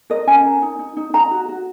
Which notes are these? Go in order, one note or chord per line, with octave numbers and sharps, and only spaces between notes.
A#4 D#5
C#4 G#5
A#4
D#4
D#4
D#4
D#4 A#5
F#4
F#4